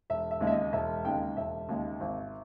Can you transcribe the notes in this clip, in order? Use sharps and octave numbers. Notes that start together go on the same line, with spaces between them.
E1 E5
E5
D#2 C#3 G#3
E5
D#5
E1 E5
D#2 C#3 G#3 G5
E1 E5
D#2 C#3 G#3
G#1